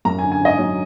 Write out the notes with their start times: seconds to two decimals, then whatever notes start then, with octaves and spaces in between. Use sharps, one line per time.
0.05 F#2 A#5
0.19 G#5
0.23 D3
0.32 G#5
0.41 G#1 D#5
0.58 F#3